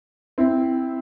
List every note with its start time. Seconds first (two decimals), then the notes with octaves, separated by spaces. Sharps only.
0.38 C4 E4